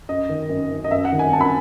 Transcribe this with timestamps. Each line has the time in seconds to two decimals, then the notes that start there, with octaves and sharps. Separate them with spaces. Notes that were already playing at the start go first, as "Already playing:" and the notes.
0.09 F#2 D#5
0.29 D#3
0.49 F#2
0.70 D#3
0.84 D#5
0.91 F#2 E5
1.05 F#5
1.12 D#3
1.19 G#5
1.33 F#2 A5
1.41 B5